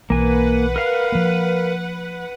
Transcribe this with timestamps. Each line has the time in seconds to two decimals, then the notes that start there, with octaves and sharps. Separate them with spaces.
0.10 B1 E3 A#3 B4 F#5 G#5
0.76 A#4 F5
1.12 F3 A#3